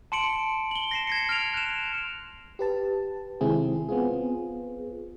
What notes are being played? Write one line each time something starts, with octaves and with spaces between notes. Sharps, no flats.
A5 C6 C#7 D7 F#7
F#7 G7
A#6 C7 E7
G#6 A#6 C#7
F6 G#6 D7 F7
F#6 E7
G4 B4 A5
C3 D#3 G#3 C4 E4 G#4
B3 C4 F4 G#4